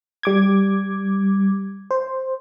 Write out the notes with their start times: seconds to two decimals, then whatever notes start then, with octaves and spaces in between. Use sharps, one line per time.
0.23 G3 D6 G#6
1.91 C5